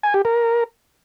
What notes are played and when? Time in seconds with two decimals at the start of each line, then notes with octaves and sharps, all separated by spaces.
0.03 G#5
0.14 G4
0.25 A#4